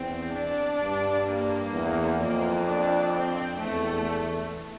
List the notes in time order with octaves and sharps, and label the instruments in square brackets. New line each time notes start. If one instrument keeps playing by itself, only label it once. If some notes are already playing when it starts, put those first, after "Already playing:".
Already playing: [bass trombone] E2 [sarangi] C4
[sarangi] D4
[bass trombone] G2
[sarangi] A#3
[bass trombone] E2
[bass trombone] F2 [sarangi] A#3
[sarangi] D4
C4
[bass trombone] E2 [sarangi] A3